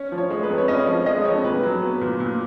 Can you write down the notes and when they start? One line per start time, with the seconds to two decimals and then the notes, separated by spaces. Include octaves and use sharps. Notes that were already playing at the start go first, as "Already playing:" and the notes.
Already playing: C#4 C#5
0.12 F3
0.18 C#5
0.30 G#3
0.43 B4
0.49 F2
0.58 C#5
0.68 C#4 D#5
0.87 F3 C#5
1.06 G#3 D#5
1.25 F2 C#5
1.44 A#2 B4
1.63 F#3
1.82 B3
2.01 A#2
2.20 A#2